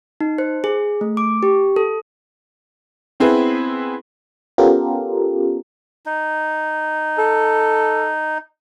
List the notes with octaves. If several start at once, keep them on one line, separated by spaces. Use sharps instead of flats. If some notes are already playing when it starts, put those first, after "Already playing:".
D#4
C5
G#4
A3
D6
G4
A4
B3 C4 E4 G#4 B4
B3 C#4 F4 G4 A4 A#4
D#4
A4